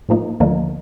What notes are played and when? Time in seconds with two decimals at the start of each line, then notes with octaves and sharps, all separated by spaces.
0.09 A2 F3 A#3 D#4
0.40 D2 D3 F3 A#3 D#4